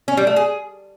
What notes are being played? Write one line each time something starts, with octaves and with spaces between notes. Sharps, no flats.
C#4
G3
A3
G#4